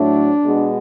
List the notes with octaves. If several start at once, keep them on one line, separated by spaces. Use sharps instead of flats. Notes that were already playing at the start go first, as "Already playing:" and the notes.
Already playing: A2 F#3 A3 D4
B2 G#3 B3